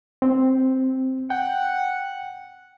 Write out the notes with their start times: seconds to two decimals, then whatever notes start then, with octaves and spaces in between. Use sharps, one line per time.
0.22 C4
1.30 F#5 G5